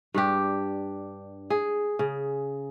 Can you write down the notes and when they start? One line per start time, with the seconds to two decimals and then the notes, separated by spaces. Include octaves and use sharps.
0.14 G2 D4 G4
1.50 G#4
1.99 C#3